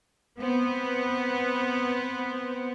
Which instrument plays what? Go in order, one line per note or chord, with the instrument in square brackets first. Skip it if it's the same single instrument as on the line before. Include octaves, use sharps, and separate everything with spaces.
[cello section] B3 [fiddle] C4